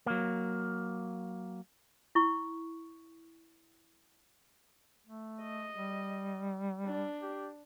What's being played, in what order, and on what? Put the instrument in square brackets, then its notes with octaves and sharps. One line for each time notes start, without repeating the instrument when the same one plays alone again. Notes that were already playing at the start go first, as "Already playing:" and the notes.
[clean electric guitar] F#3 A#3
[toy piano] E4 C#6
[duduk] A3
[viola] D#5
[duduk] G3
[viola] D4
[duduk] G4